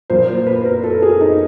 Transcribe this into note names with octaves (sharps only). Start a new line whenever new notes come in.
A#2 F3 A#3 C5
C5
B4
A#4
A4
G#4
D#4